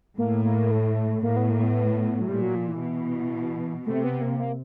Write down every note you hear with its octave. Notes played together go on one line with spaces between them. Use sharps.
A2 A#3
A#3
A3
A2 A#3
B3
A#3
B3
F#3
A#2 G3
F#3
F3
E3
B2
C3 A3
B3
A#3
A#3